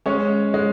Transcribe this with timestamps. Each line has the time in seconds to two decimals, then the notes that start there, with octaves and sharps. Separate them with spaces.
0.06 G#3 C#4 C#5
0.54 G#3